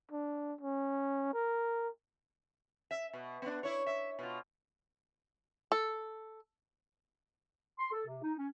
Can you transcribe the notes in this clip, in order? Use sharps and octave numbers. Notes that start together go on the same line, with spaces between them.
D4
C#4
A#4
E5
B2
B3 D4
E4 C#5
E5
B2 F4
A4
C6
A4
C3
D#4
C#4